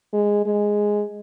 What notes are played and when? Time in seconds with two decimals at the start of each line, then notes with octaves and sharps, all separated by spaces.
0.13 G#3
0.46 G#3